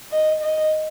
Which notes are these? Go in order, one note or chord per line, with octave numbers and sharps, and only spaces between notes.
D#5
D#5